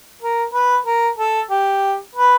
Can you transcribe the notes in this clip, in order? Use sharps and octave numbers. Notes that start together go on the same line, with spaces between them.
A#4
B4
A#4
A4
G4
B4